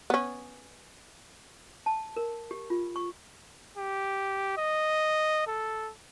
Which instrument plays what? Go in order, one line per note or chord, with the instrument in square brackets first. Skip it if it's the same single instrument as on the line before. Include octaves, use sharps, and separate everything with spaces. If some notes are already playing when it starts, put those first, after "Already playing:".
[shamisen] B3 C#4
[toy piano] A5
A#4
G4
F4
C#6
[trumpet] G4
D#5
A4